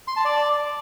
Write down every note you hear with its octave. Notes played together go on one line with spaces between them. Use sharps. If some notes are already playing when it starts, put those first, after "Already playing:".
C6
A5
D5